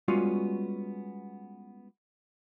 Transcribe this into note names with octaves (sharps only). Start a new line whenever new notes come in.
G3 G#3 B3 C#4 F4 F#4